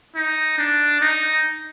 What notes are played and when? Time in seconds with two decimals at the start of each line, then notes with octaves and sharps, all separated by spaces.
0.15 D#4
0.58 D4
1.01 D#4